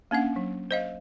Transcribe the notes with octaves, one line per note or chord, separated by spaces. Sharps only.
A#3 C#4 D4 F#5
F#3
C5 D#5 F5